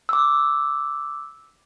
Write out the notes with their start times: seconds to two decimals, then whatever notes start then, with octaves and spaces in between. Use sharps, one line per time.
0.09 D6 E6